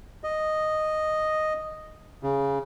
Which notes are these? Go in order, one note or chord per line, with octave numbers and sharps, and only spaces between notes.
D#5
C#3